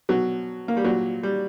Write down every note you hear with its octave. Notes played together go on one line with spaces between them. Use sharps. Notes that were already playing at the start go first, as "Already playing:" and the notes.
B2 F#3
A#3
G3
A#2 F#3
G3